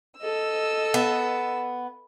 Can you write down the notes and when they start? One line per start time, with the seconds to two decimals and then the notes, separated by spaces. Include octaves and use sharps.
0.18 A4 D#5 E6
0.94 B3